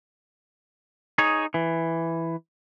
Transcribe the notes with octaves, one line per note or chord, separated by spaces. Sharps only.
D#4 G#4 C#5
E3